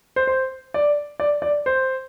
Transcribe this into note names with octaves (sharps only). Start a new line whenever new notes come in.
C5
C5
D5
D5
D5
C5